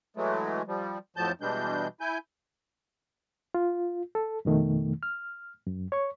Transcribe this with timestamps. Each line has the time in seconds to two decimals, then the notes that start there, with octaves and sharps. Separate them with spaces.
0.16 E3 F#3 G#3 A3
0.67 F3 G3
1.16 F2 A2 F3 F#3 A5 G6
1.41 B2 E3 G3 G#3 D4 G6
2.01 E4 G#5 G6
3.54 F4
4.15 A4
4.45 F2 B2 D#3 A3
5.03 F6
5.67 F#2
5.92 C#5 C#6